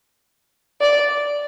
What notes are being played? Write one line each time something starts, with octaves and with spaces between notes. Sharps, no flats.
D5